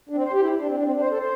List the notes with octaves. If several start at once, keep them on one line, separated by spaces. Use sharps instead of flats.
D4
C4
C5
G4
E4
D4
C4
D4
C4
D4
C5
A4
C5